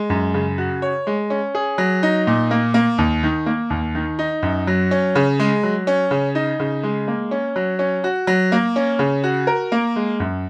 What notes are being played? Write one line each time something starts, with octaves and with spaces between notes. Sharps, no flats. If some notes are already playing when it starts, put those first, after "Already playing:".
Already playing: G#3
F#2
C#3
F#4
C#5
G#3
C#4
G#4
F#3
D#4
A#2
A#3
A#3
D#2
D#3
A#3
D#2
D#3
D#4
F#2
F#3
C#4
C#3
G#3
F#3
C#4
C#3
D#4
C#3
G#3
A#3
C#4
F#3
C#4
F#4
F#3
A#3
C#4
C#3
F#4
A#4
A#3
G#3
F#2